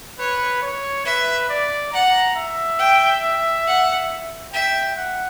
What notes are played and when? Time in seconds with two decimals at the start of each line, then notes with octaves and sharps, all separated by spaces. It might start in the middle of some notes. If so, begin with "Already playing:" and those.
0.19 B4 C#5
0.62 C#5
1.05 B4 E5
1.49 D5
1.92 F#5 A#5
2.36 E5
2.79 G5
3.67 F#5
4.53 E5 G5
4.97 F#5